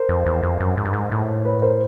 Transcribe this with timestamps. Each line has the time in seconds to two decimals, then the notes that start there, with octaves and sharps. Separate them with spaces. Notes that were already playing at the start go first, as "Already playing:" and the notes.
Already playing: A#4 C5
0.09 F2
0.26 E2
0.43 F2
0.60 F#2
0.77 G#2
0.85 G2
0.93 G#2
1.11 A2
1.45 B4 C#5
1.62 A#4 C5